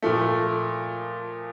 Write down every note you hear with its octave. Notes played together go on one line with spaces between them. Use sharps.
A#2 F3 A3